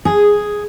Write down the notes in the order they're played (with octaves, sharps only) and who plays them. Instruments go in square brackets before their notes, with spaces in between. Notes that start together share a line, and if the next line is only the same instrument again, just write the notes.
[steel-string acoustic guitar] G#4